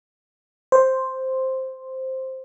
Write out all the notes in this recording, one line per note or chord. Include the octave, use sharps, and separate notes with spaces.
C5